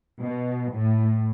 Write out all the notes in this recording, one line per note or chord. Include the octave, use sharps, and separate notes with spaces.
B2
A2